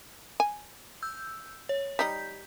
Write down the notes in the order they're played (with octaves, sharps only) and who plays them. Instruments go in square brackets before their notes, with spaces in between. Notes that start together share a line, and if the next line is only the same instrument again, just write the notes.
[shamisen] G#5
[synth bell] E6 G6
C#5
[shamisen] G3 D#4 [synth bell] G6 B6